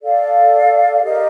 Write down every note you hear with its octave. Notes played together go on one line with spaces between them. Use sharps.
A4 D5 F5
G4 A#4 D#5